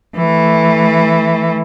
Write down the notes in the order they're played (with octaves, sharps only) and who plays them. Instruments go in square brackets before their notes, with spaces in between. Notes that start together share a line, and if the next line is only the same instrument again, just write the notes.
[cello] E3 A3